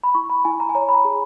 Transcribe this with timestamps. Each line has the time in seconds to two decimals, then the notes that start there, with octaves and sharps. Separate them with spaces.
0.04 B5
0.15 E4 C#6
0.30 B5
0.45 E4 G#5
0.60 A#5
0.69 G#5
0.75 C#5 A#5
0.89 B5
0.94 A#5
1.05 G#4